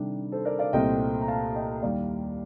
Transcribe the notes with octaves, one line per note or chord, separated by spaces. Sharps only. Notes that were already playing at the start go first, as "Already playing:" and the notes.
Already playing: C3 D#3 G3 D4 A4
A4 C5
A#4 D5
D5 F5
C2 A#2 A3 C4 D#5 G5
A#5
F5 A5
D#5 G5
D#2 D#3 G3 D5 F5